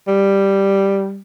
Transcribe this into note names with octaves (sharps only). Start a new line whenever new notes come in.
G3